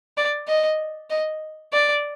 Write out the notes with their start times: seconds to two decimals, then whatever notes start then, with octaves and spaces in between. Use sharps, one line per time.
0.17 D5
0.48 D#5
1.10 D#5
1.73 D5